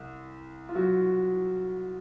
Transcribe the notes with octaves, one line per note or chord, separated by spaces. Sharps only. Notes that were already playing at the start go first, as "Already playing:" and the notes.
Already playing: C2
F4
F#3 F#4